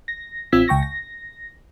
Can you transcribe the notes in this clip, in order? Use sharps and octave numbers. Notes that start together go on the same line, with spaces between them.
A#6
A1 C4 F4 E6 G#6 B6
C#2 G5 C#6 A#6
A#6